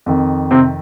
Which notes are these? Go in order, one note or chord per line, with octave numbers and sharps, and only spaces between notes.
F2 D#3
C3 C4